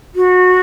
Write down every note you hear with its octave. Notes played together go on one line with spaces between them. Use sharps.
F#4